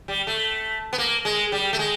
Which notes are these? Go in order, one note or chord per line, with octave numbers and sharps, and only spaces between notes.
G3
A3
B3
A#3
G#3
G3
A3
G#3